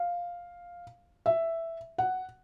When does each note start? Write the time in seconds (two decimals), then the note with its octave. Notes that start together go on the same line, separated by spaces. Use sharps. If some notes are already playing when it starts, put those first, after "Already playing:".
Already playing: F5
1.26 E5
1.98 F#5